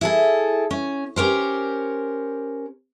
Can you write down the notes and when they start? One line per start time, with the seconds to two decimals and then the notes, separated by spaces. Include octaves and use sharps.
0.01 E4 G#4 A4
0.71 C#4
1.16 C#4 G4 A#4 C5